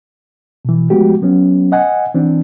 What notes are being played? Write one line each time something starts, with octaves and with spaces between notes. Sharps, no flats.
B2 E3
F3 G#3 A3 B3 F#4 G4
F#3 B3 C#4
D#5 F#5 G#5
E3 C4 D4